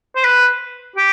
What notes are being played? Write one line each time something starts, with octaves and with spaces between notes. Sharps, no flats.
C5
B4
G4